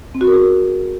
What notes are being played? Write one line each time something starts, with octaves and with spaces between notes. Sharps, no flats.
C4
F#4
A#4
G#4